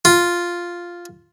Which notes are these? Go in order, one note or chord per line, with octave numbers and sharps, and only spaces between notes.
F4